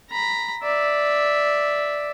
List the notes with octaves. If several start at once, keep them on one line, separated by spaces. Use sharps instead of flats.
A#5 B5
D5 E5